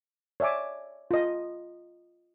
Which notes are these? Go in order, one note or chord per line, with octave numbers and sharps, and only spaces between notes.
C#5 D5 E5 G#5 D6
F4 D#5